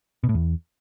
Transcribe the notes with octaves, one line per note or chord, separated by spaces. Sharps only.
B2
A2
E2